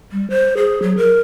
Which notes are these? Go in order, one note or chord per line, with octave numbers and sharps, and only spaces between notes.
G3
C5
G#4
F#3
A#4